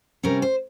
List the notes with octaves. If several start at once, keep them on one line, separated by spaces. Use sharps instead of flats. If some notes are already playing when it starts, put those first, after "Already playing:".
C3 G3 C#4 A#4
C5